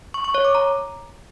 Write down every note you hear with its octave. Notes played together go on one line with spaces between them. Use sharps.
C#6
C#6
C#5
D6
A#5